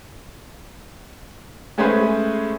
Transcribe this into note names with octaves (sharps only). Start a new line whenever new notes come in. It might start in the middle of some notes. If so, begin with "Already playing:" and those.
G#3 A3 C#4 G#4 B4 C5